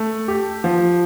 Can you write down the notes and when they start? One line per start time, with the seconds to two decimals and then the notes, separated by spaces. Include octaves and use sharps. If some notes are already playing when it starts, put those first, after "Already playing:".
Already playing: A3
0.28 G4
0.64 F3